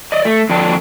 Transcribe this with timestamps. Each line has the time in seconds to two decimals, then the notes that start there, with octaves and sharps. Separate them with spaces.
0.12 D5 D#5
0.25 A3
0.49 F2 D3 C4 D4 G5